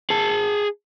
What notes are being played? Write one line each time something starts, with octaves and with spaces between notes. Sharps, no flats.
G#4 A5